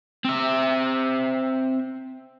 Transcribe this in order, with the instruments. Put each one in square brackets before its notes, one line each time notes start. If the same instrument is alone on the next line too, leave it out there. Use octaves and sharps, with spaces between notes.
[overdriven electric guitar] C4 E5